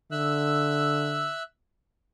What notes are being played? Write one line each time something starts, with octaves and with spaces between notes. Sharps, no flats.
D3 E5 E6 F#6